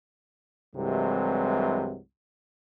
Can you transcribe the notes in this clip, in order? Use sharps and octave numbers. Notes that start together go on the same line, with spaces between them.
C2 G2 C3 E3 F#3 G#3